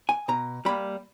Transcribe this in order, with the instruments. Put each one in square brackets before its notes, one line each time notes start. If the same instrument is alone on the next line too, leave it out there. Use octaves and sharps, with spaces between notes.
[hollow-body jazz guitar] G#5
B2 A#5
G3 A#3 B5